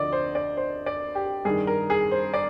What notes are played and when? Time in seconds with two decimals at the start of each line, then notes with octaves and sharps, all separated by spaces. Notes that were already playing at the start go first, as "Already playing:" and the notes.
Already playing: D2 D3 F3 D5 D#5
0.12 C5
0.35 D5
0.57 C5
0.86 D5
1.15 G4
1.45 G2 D#3 G#4
1.67 A#4
1.90 G#4
2.11 C5
2.34 D5